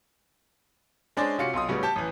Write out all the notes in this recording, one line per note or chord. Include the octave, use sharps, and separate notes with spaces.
G#3 C#4 D4 G#4 C5 D5
C3 C#4 F4 F#4 C#7
B1 F4 C6 D#6
A2 C#3 G3 B3 F#4
G4 A5 G6
A1 E3